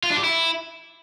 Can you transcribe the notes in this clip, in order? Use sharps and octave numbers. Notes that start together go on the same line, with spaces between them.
F4
D4
G4
E4